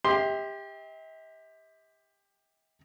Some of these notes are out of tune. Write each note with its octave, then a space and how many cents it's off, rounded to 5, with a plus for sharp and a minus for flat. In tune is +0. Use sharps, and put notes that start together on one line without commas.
G4 +20 E5 -45 C6 +0